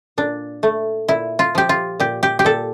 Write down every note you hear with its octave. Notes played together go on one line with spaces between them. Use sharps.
A#2 D4
A3
A#2 E4
F4
F3 G4
F4
A#2 G4
G4
G4
A#2 A4